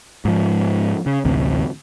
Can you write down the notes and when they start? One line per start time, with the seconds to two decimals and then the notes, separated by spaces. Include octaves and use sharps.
0.25 G#2 F3
1.06 C#3
1.25 A1 D2 C3